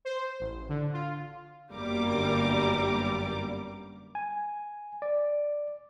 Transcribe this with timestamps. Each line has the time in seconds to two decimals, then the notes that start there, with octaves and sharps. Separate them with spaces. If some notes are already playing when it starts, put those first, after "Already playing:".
0.05 C5
0.40 A1
0.69 D3
0.93 F4
1.72 G1 F#2 G3 A#3 A#4 D6
4.15 G#5
5.02 D5